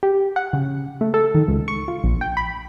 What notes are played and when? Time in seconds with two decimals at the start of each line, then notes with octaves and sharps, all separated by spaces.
0.03 G4
0.36 F#5
0.53 C#3
1.01 A3
1.14 A4
1.35 D#3
1.48 C#2
1.68 C#6
1.88 F4
2.04 A#1
2.21 G5
2.37 B5